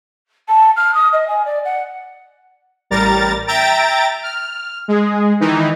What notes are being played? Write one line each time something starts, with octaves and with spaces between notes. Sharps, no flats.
A5
F6
D#6
D#5
G#5
D5
F#5
A1 G3 A#4 A#5 A6
E5 G5 A#5 A6 D7
F6
G#3 G#4
D#3 E3 D#4